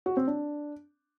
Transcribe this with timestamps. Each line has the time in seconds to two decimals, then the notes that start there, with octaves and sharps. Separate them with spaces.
0.06 F#4
0.17 C4
0.27 D4